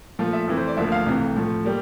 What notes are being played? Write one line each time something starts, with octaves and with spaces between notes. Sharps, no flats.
A#2 F3 A3 F4
E5
F2 E3 A3
C5
D5
D2 D3 F3 A#3 E5
F5
C2 C3 E3 A3
A2 F3 A3
G3 A#3